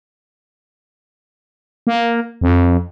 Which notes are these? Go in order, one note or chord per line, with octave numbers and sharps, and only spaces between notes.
A#3
F2